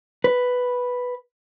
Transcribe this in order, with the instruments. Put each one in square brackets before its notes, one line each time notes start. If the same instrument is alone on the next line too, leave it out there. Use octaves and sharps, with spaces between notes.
[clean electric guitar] B4